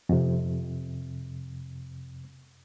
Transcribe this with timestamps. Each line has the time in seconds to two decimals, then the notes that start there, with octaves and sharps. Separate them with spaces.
0.09 F2 C3